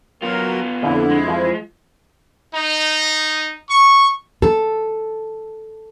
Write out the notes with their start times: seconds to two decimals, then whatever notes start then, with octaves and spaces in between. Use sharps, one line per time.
0.22 F#3 B3 F4 A#4
0.83 F2 D3 E4
1.10 G#3
1.28 F3
2.55 D#4
3.70 C#6
4.42 A4